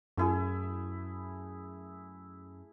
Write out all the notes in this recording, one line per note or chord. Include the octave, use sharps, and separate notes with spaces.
F#2 A3 E4 G#4